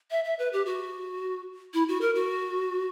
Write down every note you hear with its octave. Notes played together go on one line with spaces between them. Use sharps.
E5
E5
B4
G4
F#4
E4
F#4
A#4
F#4